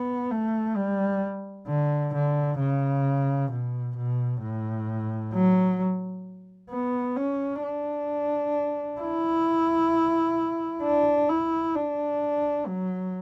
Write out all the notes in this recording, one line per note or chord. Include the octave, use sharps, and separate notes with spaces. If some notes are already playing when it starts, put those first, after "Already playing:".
Already playing: B3
A3
G3
D3
D3
C#3
B2
B2
A2
F#3
B3
C#4
D4
E4
D4
E4
D4
F#3